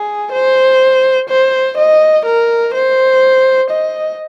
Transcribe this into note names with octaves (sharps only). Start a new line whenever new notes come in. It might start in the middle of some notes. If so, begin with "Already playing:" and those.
Already playing: G#4
C5
C5
D#5
A#4
C5
D#5